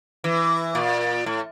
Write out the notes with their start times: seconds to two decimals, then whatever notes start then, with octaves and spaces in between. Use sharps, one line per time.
0.24 E3
0.75 A#2
1.26 A2